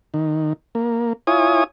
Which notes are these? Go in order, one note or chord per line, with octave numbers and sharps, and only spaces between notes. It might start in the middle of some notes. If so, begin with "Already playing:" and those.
D#3
A#3
E4 F4 C#5 G#5 D#6